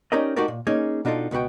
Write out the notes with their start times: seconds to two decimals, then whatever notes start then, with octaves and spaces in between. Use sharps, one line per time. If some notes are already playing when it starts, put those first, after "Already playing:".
0.12 C#4 D#4 G4 A#4 D5 D#5
0.36 A3 D#4 F#4 G4 A#4 D5
0.48 A#2
0.67 A#3 C#4 D#4 G#4
1.05 B2 D4 D#4 F4 A4
1.31 C#2 B2 B3 F#4 G5